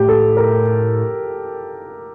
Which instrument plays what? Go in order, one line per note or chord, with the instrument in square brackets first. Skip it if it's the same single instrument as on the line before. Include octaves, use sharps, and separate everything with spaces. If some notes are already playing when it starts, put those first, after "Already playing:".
Already playing: [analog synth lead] A2 [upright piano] G4
[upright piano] A4
A#4